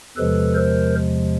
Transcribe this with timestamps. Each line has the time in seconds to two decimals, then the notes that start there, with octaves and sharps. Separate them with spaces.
0.17 E2 C3 F3 G#3 A4 B4
0.55 A#4 C5